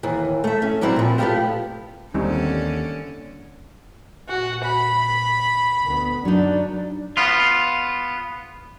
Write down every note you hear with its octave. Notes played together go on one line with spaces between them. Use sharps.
D#2 E3
A3 E5
C#4
D3 F#3 G3 C4 E4
A#2 F3
A3 B3 D4 E4 F4 G4
D#2 D3 E3 G3 C4 C#4 D#4
A#2 F#4
B5
D2 B3
F#2 F#3 D4 D#4
B3 F4